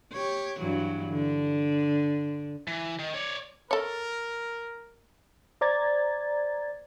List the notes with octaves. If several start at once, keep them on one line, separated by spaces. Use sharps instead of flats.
G4 C#5
G2 E3 F#3
D3
E3
D#3
C#5 D5
A4 A#4 C#5
C5 D5 A#5 G#6 A6